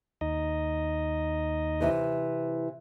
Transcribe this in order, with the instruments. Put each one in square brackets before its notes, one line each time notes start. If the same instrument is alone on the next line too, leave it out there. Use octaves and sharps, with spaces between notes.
[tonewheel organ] D#2 D#4 D#5
[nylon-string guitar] C3 E3